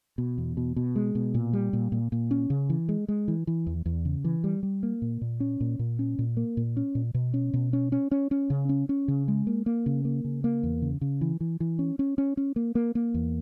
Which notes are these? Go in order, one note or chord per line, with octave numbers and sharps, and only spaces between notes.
B2
E2
B2
B2
G#3
B2
A#2
G3
A#2
A#2
A#2
C#4
C#3
E3
G#3
G#3
E3
E3
E2
E2
C#3
E3
G3
G3
A#3
A#2
A#2
C#4
A#2
A#2
C#4
A#2
A#3
A#2
C#4
A#2
B2
C#4
B2
C#4
C#4
C#4
C#4
C#3
C#4
C#4
C#3
G#3
A#3
A#3
C#3
A#3
C#3
A#3
E2
C#3
C#3
E3
E3
E3
C#4
C#4
C#4
C#4
A#3
A#3
A#3
E2